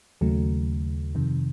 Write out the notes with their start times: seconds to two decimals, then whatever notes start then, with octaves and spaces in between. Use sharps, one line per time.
0.21 D#2 C#3 F#3 A3
1.15 F2 C3 D#3